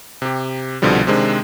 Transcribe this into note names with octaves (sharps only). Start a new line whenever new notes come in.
C3 G4
C2 B2 D3 F3 G3
C3 D#3 G#3 C4 D4